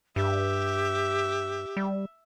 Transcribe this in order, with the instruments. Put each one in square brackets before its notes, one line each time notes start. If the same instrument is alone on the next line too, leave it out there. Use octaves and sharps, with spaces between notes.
[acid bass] G2 [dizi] G4 [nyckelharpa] E5
[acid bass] G3